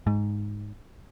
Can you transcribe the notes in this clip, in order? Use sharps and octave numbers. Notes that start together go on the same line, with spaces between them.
G#2